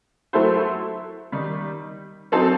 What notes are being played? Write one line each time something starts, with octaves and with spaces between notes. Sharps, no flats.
F#3 A3 E4 A4 C5
D#3 G3 D#4
F#3 C4 D#4 A4